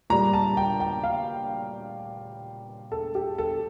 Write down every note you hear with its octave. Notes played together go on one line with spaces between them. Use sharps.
A#2 G3 A#5
A5
G5
G5
F5
A4
G4
A4